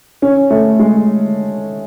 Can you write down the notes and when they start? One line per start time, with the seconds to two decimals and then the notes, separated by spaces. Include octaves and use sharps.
0.22 C#4
0.50 A3
0.79 G#3